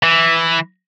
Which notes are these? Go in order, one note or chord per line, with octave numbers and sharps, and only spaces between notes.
E3